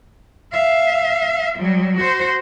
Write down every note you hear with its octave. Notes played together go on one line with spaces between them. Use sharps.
E5 F5
F#3 G3
F#4 C5